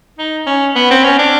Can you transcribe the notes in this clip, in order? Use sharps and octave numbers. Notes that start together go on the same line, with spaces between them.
D#4
C#4
B3
C4
C#4
D4